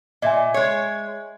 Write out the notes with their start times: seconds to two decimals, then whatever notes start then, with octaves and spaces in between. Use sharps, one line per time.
0.22 A#2 D#5 E5 G#5
0.54 G#3 C#5